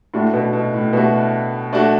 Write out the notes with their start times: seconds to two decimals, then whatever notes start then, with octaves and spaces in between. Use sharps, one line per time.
0.14 A2 A3 D4 F#4
0.33 B2
0.53 B2
0.74 A2
0.93 B2 A3 D4 F#4
1.73 A3 D4 F#4